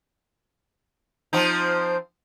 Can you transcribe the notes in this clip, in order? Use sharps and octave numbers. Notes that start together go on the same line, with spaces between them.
F3 C4 D#4